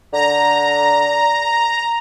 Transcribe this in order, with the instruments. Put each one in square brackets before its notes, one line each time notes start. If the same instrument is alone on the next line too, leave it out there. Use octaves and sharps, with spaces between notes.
[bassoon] D3 [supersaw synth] A#5